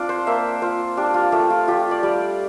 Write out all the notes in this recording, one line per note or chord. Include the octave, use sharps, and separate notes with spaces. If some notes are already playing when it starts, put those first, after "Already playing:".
Already playing: C4 D4 F4 D5
C5
A#3 E5
F4 C5
D4 G4
F4
A3 G4
F4
F4 G4
D5
G3